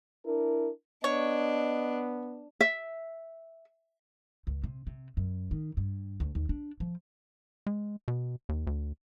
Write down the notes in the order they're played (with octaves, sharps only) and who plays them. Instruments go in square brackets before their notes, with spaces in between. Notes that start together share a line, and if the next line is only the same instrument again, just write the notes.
[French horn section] D4 E4 A#4
[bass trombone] B3 [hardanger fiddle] D4 [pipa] C#5 [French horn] D#5
[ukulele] E5
[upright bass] C#2
C3
C3
F#2
D#3
G2
D2
D#2
D4
F3
[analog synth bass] G#3
B2
D#2
D2